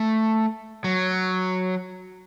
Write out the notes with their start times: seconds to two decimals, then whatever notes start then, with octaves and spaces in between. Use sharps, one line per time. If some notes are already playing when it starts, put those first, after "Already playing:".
Already playing: A3
0.84 F#3